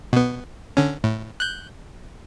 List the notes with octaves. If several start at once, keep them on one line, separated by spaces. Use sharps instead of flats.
B2 B3
D3 C#4
A2
F#6 G6